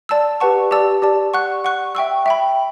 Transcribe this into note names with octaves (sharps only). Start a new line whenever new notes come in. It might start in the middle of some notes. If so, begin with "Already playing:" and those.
D5 A5 E6
G4 B4 F#5 A5 C#6
G4 D5 A5 E6
G4 D5 A5
F#5 C#6 F#6
F#5 C#6 F#6
E5 G5 C#6 E6
E5 G5 B5